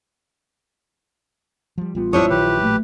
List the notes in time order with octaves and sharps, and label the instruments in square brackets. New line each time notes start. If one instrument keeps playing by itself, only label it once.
[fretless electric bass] F3 G3
[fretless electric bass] A1 G3 B3 [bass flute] F4
[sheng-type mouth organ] D4 C#6 D#6 [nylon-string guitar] E4 C5 C#5
[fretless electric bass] A#1 D#3 F#3 [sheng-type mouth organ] G4 B4
[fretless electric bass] A1 A#2 F#3 [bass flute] A3